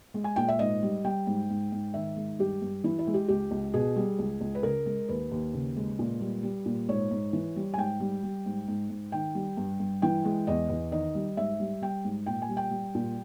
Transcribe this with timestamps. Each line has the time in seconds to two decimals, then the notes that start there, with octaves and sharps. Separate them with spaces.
0.14 G#3
0.24 G#5
0.36 A#2 G5
0.48 E5
0.59 G#2 D#5
0.83 G3
1.05 G3 G5
1.27 G#2
1.50 G#2
1.72 G#2
1.94 D#3 E5
2.16 G#3
2.39 G2 G4
2.62 G2
2.84 E3 E4
2.99 E4
3.07 G#3
3.14 G4
3.28 C#2 G4
3.51 C#2
3.74 B2 G#4
3.96 G3
4.19 C#2
4.41 C#2
4.55 B4
4.63 C#3 A#4
4.86 G#3
5.09 D#2 B4
5.31 D#2
5.54 C#3
5.76 G#3
5.99 A#2
6.21 G3
6.43 G3
6.66 A#2
6.89 G#2 C#5
7.11 G#2
7.33 E3
7.56 G3
7.74 G#5
7.77 G#2 G5
8.00 G3
8.23 G3
8.46 G#2
8.68 G#2
8.90 G#2
9.12 D#3 G5
9.35 G3
9.57 G2
9.80 G2
10.02 E3 G5
10.25 G#3
10.47 E2 D#5
10.70 E2
10.92 D#3 D#5
11.15 G3
11.37 G#2 E5
11.60 G3
11.82 G3 G5
12.05 G#2
12.26 A#2 G5
12.42 G#5
12.49 G3
12.57 G5
12.71 G3
12.95 A#2